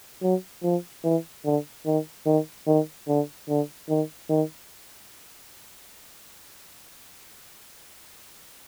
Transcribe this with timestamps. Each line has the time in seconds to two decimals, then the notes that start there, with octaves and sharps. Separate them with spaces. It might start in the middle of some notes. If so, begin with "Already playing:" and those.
0.22 F#3
0.63 F3
1.04 E3
1.45 D3
1.86 D#3
2.26 D#3
2.67 D#3
3.08 D3
3.48 D3
3.89 D#3
4.29 D#3